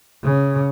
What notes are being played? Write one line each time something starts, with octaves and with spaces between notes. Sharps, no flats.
C#3